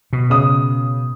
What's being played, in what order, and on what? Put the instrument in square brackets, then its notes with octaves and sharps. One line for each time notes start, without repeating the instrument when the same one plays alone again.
[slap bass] B2
[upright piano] C#3 D#6